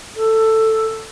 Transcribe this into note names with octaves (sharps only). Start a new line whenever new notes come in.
A4